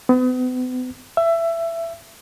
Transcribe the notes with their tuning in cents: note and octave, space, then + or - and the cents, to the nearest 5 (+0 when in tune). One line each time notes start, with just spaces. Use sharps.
B3 +40
E5 +20